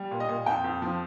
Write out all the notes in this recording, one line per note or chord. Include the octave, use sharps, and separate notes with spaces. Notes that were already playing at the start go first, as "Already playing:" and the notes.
Already playing: G3
A#2
D#5
A#2
F2 G5
F2
F3